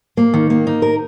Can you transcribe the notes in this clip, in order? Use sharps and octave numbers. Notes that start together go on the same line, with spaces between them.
A#3
D#3
A#3
D#4
A#4